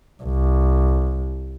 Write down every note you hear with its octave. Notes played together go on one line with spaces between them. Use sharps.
C2